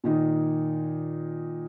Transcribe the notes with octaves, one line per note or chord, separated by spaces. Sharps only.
A#2 D#3 D#4